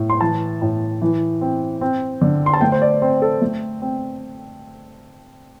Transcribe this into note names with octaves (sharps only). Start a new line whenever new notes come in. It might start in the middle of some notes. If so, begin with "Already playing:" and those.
Already playing: A2
C6
E3 A5
A2
E3
C4
C4
D3
C6
A5
A3 G5
C5
D5
C4 C5
A4
A3
C4